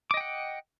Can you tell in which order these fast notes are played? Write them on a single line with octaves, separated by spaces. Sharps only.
D6 D#5 G5 F#5